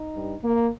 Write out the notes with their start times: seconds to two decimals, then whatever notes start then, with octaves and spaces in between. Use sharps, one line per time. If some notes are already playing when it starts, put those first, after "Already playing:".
Already playing: D#4
0.13 G2 G3
0.42 A#3